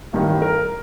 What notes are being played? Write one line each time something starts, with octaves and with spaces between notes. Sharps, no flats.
A1 G2 D#3
A#4